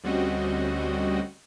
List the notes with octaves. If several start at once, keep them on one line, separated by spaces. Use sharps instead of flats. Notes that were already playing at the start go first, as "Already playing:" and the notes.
D2 G3 C4 C#4 F#4 D#5